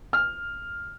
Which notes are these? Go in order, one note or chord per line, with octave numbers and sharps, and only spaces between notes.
F6